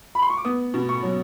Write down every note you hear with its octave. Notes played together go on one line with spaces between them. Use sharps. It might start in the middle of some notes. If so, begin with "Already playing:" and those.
B5
C6
C#6
D6
B3 D#6
B2
C#6
F#3